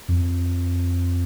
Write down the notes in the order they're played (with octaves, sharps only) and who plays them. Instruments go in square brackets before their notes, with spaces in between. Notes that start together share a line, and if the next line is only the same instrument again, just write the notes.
[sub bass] F2